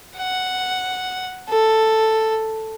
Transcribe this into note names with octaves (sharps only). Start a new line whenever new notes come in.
F#5
A4